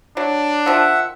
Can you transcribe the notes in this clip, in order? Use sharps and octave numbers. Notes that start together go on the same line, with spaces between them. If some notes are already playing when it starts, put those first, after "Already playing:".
F#3 D4
D#3 F3 E5 F#5